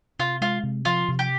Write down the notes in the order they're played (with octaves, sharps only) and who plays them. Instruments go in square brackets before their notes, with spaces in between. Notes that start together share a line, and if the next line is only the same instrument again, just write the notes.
[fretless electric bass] C3 [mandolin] F4
[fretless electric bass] G#3 [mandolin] F4
[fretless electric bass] C3
[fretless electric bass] F3 [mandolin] F4
[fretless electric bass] C3
[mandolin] G4